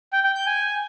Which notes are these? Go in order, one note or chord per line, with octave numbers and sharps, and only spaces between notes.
G5
G5
G6
G#5